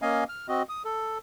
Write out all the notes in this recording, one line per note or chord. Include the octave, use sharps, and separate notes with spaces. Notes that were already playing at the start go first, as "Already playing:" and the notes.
A#3 C#4 D#5 F5 G#5
F6
C4 F#4 D#5
D#6
A4